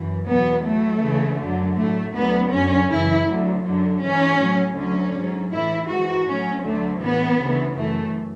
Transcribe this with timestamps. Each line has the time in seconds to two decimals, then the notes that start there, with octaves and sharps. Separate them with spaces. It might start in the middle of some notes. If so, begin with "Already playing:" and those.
Already playing: F#2 E3
0.27 E2 B2 F#3 B3
0.64 A2 F#3 A3
1.01 D2 C#3 E3
1.40 F#2 D3 F#3
1.76 A2 F#3 A3
2.14 D2 D3 F#3 B3
2.51 F#2 D3 F#3 C#4
2.89 F#2 C#3 E3 E4
3.27 D2 D3 F#3
3.64 F#2 D3 F#3
4.01 G#2 E3 C#4
4.39 A2 F#3
4.77 D2 D3 F#3 C#4
5.15 G#2 F#3
5.51 A2 E3 E4
5.88 G#2 E3 F#4
6.26 A2 F#3 C#4
6.63 D2 D3 F#3 A3
7.01 A2 E3 B3
7.39 D2 C#3 E3
7.76 F#2 E3 A3